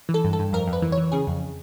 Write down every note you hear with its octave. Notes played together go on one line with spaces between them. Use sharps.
E3
A4
G2
A4
G2
F2 A#4
F2
B4
E3
C#5
E3
C#3 G#4
F2